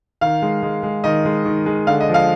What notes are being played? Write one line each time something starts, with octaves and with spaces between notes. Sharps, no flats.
D#3 F5
G#3
G#3
G#3
D#3 D#5
G#3
D#3
G#3
D3 F5
D#5
F3
F5